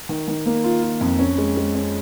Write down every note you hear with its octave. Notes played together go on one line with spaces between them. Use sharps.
D#3
D#3
A#3
F4
F4
F2
C#4
G#3
G#3
C#4